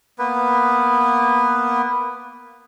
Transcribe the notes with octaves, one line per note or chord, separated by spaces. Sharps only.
A#3 B3 B4